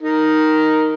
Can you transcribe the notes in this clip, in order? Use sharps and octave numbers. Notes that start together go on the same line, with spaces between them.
D#4 A#4